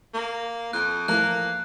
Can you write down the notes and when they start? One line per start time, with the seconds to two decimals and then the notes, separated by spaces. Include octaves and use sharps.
0.14 A#3
0.73 F2 F#6
1.08 E3 F3 A3 A#3 F#6